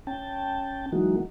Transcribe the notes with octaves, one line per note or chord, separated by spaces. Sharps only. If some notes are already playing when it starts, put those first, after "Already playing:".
C#4 G5 A5
E3 F#3 G#3 A#3 D#4 F#4